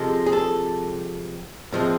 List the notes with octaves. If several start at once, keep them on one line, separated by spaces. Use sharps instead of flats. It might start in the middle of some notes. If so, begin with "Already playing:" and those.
Already playing: C3 F3 G#3 A4
G#4
A4
A2 F3 G#3 C4